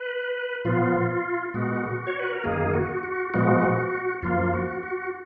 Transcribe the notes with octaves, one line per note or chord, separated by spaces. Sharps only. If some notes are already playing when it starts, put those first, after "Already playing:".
Already playing: B4
A#2 F3 B3 F4
A#2 G#3 B3 F#4
C#5
B4
A#4
F#2 D#3 A#3 G#4
F#4
F#4
A#2 F3 G#3 B3 F#4
F#2 F3 A#3 F4
F#4
F#4